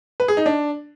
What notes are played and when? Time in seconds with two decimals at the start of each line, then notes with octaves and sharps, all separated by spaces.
0.20 B4
0.28 G#4
0.37 D#4
0.46 D4